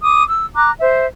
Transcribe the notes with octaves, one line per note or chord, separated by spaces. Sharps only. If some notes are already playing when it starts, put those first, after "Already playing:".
D6 D#6
E6
A#5 D6 F#6
C5 E5